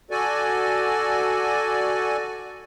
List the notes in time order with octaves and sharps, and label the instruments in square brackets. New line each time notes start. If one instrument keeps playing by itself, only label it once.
[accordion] F#4 A4 D5 G#5